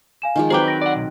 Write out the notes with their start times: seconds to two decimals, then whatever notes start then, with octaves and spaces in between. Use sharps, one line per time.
0.22 F5 G#5 E7
0.36 D#3 F3 G#3 G#5
0.50 F#3 C4 G#4 B4 C5 G5 A#5 D6
0.68 A#6 D7
0.81 D5 F#5
0.96 B1